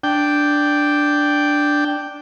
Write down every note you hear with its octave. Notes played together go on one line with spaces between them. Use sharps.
D4 G5